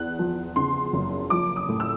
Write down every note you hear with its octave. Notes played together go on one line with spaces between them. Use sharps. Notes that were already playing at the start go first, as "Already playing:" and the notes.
Already playing: E2 F#6
F3
C#3 C6
F#1
F3 D6
D#6
A2
E6